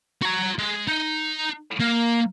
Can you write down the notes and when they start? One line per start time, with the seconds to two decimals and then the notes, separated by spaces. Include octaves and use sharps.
0.22 F#4 A#5
0.58 G#3
0.88 D#4
1.80 A#3